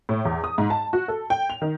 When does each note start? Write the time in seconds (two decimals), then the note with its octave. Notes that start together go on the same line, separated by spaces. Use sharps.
0.09 A2
0.25 E2
0.44 D#6
0.58 G#2
0.70 A5
0.93 F#4
1.08 A4
1.30 G5
1.50 F7
1.62 D#3